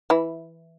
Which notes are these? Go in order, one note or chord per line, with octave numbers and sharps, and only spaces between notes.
E3 E4